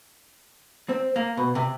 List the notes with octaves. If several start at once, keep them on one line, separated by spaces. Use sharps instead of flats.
C4
A#3
B2
C3